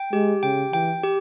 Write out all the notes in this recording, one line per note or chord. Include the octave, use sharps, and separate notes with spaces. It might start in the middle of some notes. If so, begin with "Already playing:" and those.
Already playing: G5
G#3 G4
C#3 G5
E3 G5
G4